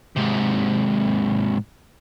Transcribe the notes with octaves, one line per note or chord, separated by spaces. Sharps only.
G#2 C3